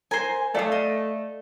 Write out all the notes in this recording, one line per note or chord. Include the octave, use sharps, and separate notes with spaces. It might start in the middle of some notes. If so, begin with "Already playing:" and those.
A#4 C5 G#5
A3 A4 D5 E5 F5 D#6
D#5